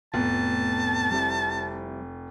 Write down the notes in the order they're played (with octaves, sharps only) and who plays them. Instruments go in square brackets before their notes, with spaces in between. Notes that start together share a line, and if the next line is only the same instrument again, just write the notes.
[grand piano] F1 [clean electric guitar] A2 B3 [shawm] A5
[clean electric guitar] G3 C4 E4